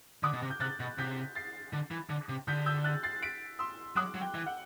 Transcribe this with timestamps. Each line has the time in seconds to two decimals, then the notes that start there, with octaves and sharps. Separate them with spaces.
0.23 D3 D6 F#6
0.33 B2
0.42 C3
0.50 G6
0.60 C3 F#6 A6
0.80 B2
0.98 C3 G6 B6
1.35 A6 C7
1.73 D3
1.91 E3
2.10 D3
2.29 C3
2.47 D3 G6 B6
2.66 E6 G6
2.84 F#6 A6
3.03 A6 C7
3.22 B6 D7
3.59 C6 E6
3.96 F#3 D6 F#6
4.15 F#3
4.21 G5
4.35 E3
4.46 F#5